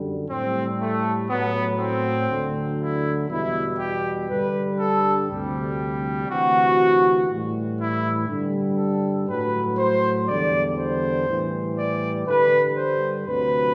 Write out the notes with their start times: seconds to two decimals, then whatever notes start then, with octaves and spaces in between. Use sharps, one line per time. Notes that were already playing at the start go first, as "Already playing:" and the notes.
Already playing: F#2 D3 G3
0.30 A2 G3 C4
0.80 A3
1.30 A2 F#3 B3
1.80 C4
2.30 D2 D3 F#3
2.80 E4
3.30 E2 B2 G3 E4
3.79 G4
4.30 G2 D3 G3 B4
4.79 A4
5.29 D2 C3 G3
6.29 D2 C3 E3 F#4
7.29 A2 E3 G3
7.78 E4
8.28 G2 D3 G3
8.78 A4
9.28 A2 F#3 B4
9.78 C5
10.28 E2 D3 G3 D5
10.78 C5
11.28 A2 E3 G3
11.77 D5
12.27 G2 D3 G3 B4
12.77 C5
13.27 D2 C3 F#3 B4